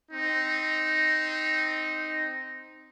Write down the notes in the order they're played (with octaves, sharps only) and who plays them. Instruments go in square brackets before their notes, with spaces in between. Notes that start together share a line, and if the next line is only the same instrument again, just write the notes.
[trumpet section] C4 D#4